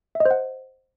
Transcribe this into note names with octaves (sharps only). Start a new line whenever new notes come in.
E5
D#5
C5
F#5